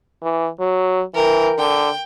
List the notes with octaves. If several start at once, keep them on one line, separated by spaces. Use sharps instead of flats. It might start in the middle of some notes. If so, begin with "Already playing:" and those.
E3
F#3
E3 A#4 G5
D3 G5